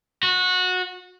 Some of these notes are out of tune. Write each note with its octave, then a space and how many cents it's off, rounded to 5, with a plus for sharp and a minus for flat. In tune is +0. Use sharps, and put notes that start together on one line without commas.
F#4 -20